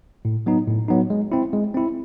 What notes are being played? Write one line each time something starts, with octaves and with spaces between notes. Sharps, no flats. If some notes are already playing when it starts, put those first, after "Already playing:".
A2
F#3 B3 D#4
A2
F#3 B3 D#4
G#3
C4 E4
G#3
C4 E4